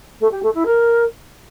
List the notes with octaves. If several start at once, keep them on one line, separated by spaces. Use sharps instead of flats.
A3
G4
A3
E4
A#4